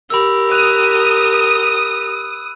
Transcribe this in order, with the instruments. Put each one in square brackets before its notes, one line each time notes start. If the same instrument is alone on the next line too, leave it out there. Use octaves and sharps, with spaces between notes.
[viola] G4 A#4 [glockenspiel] B5 E6
[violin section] D#6 [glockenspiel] F#6 F7